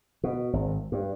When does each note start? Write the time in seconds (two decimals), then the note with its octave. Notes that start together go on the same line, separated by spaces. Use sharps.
0.24 B2
0.53 G#1
0.92 G2